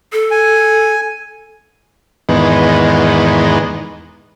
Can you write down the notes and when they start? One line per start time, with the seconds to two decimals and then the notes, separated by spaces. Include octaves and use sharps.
0.12 A4
0.31 G#5
2.29 E2 G#2 D#3 B3